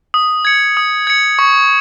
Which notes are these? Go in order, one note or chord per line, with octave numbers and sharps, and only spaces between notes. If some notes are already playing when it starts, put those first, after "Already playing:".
D#6
G#6 C#7
D#6
G#6 C#7
C#6